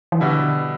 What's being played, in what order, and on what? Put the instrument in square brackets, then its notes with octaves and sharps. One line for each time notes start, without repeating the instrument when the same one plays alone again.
[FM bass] E3
[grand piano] B2 G3 E4 [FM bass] D3